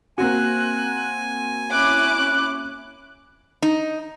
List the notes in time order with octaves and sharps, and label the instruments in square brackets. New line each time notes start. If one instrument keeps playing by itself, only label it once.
[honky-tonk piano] A#3 C4 F#4 [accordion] G#5 [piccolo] F#6
[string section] C#4 E4 D6 [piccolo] F#6
[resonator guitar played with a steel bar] D#4